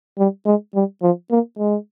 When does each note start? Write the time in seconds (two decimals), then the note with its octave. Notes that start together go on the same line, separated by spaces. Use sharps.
0.18 G3
0.46 G#3
0.75 G3
1.02 F3
1.31 A#3
1.59 G#3